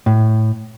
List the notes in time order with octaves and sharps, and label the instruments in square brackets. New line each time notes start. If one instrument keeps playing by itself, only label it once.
[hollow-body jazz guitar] A2